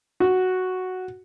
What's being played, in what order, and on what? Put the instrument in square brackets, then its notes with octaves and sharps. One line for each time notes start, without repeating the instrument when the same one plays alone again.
[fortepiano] F#4